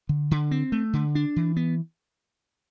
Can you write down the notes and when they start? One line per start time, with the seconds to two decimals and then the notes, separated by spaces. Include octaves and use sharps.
0.09 D3
0.31 D3
0.51 C4
0.72 A3
0.93 D3
1.15 D4
1.36 E3
1.57 B3